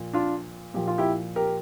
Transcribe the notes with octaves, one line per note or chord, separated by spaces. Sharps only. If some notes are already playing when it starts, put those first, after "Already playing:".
Already playing: A#2 F3
D4 F4
A#2 F3 G4
F4
E4 G4
G4 A#4